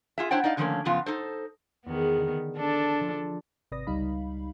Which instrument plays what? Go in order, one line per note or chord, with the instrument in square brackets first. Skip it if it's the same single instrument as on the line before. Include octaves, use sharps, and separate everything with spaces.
[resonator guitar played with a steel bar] F4 G#4 E5
D4 E4 C5 C#5 F#5 G5
D#4 D5 D#5 F5
D3 D#3 F3 A3 A#3 C#4
F#2 C#3 F3 B3 F4
D#4 A4 C5
[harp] E2 G#4 [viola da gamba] D#3 B3
[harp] D3
[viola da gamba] D4 A4
[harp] F3
[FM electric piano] G#1 C3 B4 D5 D#6 A#6
C#2 G3 D#4 F5 B5